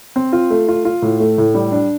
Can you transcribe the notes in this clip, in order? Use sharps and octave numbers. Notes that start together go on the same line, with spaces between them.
C4
F4
A3
F4
F4
A2
A3
A2
G3
D4